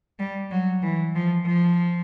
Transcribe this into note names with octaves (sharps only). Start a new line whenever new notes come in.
G3
F#3
E3
F3
F3